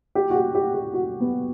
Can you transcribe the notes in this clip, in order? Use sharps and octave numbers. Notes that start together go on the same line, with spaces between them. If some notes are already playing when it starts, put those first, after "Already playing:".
G4
F#4
G4
G4
G4
F#4
B3